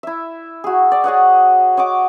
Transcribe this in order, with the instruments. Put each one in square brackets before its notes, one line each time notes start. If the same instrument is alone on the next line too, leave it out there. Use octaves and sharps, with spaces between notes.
[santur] E4 E5
F#4 G#4
D5
G#4 C#5 D#5 F#5
C#5 D#5 F#5 D6